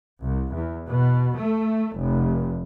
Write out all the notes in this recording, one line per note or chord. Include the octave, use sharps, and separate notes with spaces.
C2
E2
B2
A3
F1